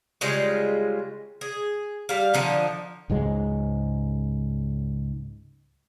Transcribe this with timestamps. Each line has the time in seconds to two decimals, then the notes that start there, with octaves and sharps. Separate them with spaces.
0.21 C#3 G3 G#3 F4
1.41 G#4
2.09 G3 F5
2.34 D3 F3 D#4
3.10 C#2 G#2 F#3 G#3